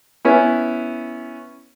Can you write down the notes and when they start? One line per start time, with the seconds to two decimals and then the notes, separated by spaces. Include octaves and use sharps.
0.25 B3 C#4 E4